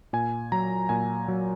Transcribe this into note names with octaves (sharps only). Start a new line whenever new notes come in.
A#2 G#5
F#3 A#5
A#2 G#5
F#3